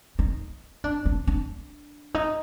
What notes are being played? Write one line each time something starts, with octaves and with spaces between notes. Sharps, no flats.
D#4
D4
D4
D4
D#4